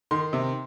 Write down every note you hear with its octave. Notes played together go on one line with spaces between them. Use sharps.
D#3 C6
C3